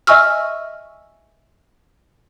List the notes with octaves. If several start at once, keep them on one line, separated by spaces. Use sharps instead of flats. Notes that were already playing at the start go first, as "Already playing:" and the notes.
D#5 E5 G#5 C#6 E6 F6